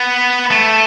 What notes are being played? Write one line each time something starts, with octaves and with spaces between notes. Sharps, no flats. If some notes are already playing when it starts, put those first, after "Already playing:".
Already playing: B3
A3